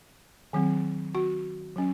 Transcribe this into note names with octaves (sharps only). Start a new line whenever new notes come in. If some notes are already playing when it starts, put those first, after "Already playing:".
D#3 F#3 C4
F#4
F#3 C#4